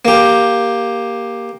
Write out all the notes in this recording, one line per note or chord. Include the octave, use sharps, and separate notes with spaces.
A#3 G4